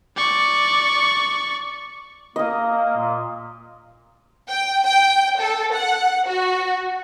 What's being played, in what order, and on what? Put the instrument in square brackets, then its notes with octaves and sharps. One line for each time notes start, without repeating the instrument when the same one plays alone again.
[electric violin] D5 C#6
[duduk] A#3 [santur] D#5 D#6
[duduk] A#2
[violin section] G5
G5
A4
F#5
F#4